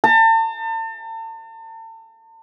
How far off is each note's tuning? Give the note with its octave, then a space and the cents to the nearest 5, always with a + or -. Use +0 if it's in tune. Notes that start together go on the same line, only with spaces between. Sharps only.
A5 +40